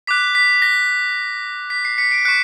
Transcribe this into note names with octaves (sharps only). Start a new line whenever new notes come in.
D6 F#6 B6
B6
A#6
B6
C7
B6 C#7
C7 D7
C#6 F#6 B6 C#7